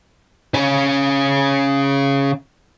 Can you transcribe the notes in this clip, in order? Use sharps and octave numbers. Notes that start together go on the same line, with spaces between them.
C#3 C#4